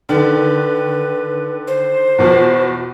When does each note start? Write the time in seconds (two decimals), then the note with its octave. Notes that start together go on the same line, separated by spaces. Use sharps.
0.09 D3 D#3 B4
1.67 C5
2.18 E2 B2 F3